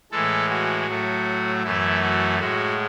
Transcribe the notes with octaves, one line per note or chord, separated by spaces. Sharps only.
A2 E3 G#3 A4
F#4
A2 F#3 A3
F#2 E3 A3 E4
F#4
A2 G#3 F#4